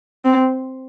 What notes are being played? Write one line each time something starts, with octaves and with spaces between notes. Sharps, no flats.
C4